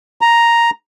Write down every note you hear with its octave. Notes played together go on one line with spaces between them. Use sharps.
A#5